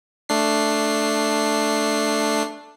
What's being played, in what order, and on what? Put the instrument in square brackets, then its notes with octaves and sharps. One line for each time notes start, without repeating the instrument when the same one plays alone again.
[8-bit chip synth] A3 D4 C7